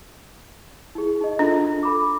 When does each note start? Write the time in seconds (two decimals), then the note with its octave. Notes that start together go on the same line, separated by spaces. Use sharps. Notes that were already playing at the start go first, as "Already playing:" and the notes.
0.95 E4 G#4
1.21 D#4 D#5
1.39 D4 F4 A4 D#5
1.83 A4 B5 D6